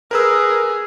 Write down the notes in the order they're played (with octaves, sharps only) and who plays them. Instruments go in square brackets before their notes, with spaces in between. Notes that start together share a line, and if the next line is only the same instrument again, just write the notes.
[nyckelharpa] G#4 [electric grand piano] A#4 B4 E6